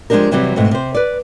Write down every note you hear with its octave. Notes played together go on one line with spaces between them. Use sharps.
F3 G#3 B3 D4 G4 A#4
C3 E3 F#3 G3 C4
G#2 B2 A3 C4
C3 C5
B4 D5